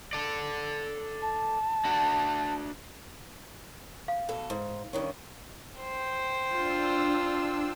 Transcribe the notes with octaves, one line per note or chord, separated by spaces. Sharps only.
A4 D5
A5
D4 F#4
F5
B2 A4
G#2
G2 D#3 C#4
C5 G5
D4 F4 E6